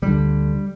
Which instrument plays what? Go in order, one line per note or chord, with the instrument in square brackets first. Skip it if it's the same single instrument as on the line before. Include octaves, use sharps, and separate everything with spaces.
[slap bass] D2 D3 G3